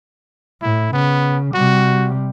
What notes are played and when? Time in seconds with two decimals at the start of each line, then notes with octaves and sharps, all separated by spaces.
0.62 A2 E4
0.93 C#3 B3
1.54 C3 G3 F#4